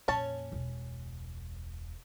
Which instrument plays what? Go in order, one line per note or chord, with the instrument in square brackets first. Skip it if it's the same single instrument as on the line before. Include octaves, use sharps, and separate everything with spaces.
[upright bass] F2 A#2 [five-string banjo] C#4 C#5 A5
[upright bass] E1 C#2